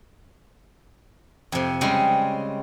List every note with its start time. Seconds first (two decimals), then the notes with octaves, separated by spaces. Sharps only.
1.52 F2 C3
1.81 C#3 G3 G#3 C4